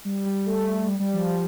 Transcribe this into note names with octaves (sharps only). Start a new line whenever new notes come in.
G3
G3
A3
G3
G3
F3
F3